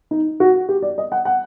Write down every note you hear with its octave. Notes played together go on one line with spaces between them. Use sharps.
D#4
F#4
G4
D5
D#5
F#5
F#5